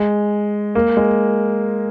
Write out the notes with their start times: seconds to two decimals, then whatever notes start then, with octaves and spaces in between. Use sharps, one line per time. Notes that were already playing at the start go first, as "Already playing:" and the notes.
Already playing: G#3
0.75 A#3
0.97 G#3